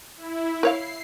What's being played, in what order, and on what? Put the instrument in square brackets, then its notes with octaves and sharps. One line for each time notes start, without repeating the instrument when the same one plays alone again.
[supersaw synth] E4
[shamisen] A#4 C#5 F5 [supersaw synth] C7